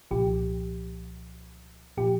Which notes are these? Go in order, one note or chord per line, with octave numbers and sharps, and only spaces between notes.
C2 A#2 F3 G4
A#2 F3 G4